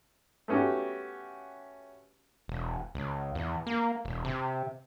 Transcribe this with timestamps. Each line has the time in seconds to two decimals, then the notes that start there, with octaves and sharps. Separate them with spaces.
0.48 A3 B3 C#4 F#4 G4
2.48 E1
2.95 C#2
3.35 E2
3.67 A#3
4.05 E1
4.25 C3